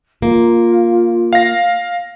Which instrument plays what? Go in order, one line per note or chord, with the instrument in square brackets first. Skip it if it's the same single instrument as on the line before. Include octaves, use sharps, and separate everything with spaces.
[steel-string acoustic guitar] A#3 [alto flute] F4
[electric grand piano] F5 A#6